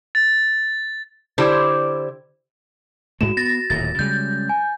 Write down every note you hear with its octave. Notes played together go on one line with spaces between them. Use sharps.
A6
D3 E4 G4 C5 D5
G#2 G#3 A3 F#4 E7
B3 A6 A#6
D1 D#2 A#2 A6
C#3 G3 G#3 G6
G#5